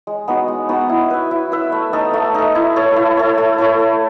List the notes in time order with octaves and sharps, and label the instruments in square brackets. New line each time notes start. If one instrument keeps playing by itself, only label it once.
[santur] G#3
B3 D#4 F#4
G#3
B3 D#4 F#4
E4
B4 E5
E4
B4 E5
A3
D#4 A4
A3
D#4 A4
E4
A4 C#5
E4
A4 C#5
A3
E4 A4 C#5
A3